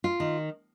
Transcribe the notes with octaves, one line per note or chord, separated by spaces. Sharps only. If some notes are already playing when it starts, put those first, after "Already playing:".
F4
D#3